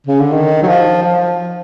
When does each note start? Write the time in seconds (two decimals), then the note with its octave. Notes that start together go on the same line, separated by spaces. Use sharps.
0.07 C#3
0.20 D3
0.32 D#3
0.63 F#3
0.68 F3
1.03 F3